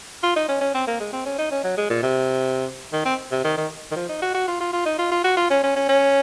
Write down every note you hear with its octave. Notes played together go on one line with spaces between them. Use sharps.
F4
D#4
C#4
C#4
C4
A#3
G#3
C4
C#4
D#4
C#4
F#3
G#3
A#2
C3
D#3
C4
C3
D#3
D#3
D#3
F3
D#4
F#4
F#4
F4
F4
F4
D#4
F4
F4
F#4
F4
C#4
C#4
C#4
C#4